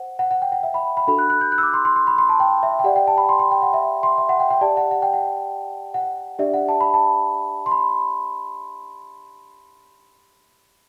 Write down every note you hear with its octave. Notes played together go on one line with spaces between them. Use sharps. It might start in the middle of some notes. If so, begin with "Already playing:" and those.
Already playing: C5 F#5
F#5
F#5
G5
F#5
E5
B5
B5
D4 F#4 A4 B5
F#6
F#6
G6
F#6
E6
D6
C6
C6
C6
B5
C6
A5
G5
E5
G5
G4 D5 F#5
G5
A5
B5
C6
C6
G5
F#5
E5
C6
E5
F#5
G5
G5
G4 D5 A5
F#5
F#5
G5
F#5
F#5
D4 G4 D5 E5
F#5
A5
B5
A5
C6
B5